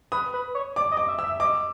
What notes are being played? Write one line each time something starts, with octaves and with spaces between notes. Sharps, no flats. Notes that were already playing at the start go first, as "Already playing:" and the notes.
B4 D#6
B4
C#5
D5 D6
D#5
D6
E5
E5 E6
D#5 D6